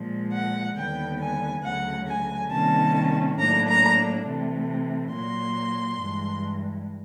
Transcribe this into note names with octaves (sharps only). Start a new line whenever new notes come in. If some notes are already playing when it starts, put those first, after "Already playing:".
Already playing: A#2 F3 G#3
F#5
D#2 D3 G3 B3 G5
G#5
D2 C#3 F#3 F#5
G#5
C3 D#3 G3 A#3 C#4 A5
A2 F#3 A#3 D4 A#5
A#5
C3 E3 A3
A#2 F#3 A#3 C6
G2 E3 G#3